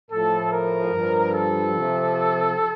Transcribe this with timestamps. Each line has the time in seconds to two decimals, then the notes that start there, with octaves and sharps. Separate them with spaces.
0.11 A2 F3 A4
0.52 A#4
0.92 G2 F3
1.34 A4
1.74 C3 F3